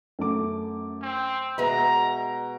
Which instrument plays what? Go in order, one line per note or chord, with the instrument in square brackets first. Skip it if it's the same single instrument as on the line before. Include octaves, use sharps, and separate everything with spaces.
[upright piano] F#2 A3 D6
[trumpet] C4
[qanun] B2 G#3 B3 [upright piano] E5 [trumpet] A#5